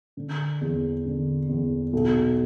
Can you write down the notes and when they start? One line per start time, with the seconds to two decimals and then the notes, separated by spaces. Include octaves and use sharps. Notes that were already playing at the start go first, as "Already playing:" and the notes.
0.17 D3
0.61 E2
1.05 D3
1.49 E2
1.93 B1